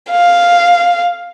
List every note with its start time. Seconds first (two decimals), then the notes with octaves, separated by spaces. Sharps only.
0.10 F5